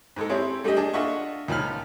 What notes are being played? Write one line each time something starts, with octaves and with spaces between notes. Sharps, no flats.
G#2 G#3 A4
C4 E4 G4 G#4 C#5
G3 A3 D4 G4 G#4 D#5
D4 G#4 A5
D4 F4 D#5 E5 F#5 C#6
C#2 A#2 F3 D#4 B5 F6